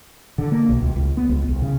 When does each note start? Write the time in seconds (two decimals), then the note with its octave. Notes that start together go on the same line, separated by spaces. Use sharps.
0.38 D3
0.52 A#3
0.69 B1
0.82 C#2
0.96 C#2
1.17 B3
1.29 C#2
1.48 C2
1.62 C#3